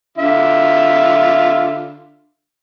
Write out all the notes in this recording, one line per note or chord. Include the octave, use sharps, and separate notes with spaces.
D3 F4 E5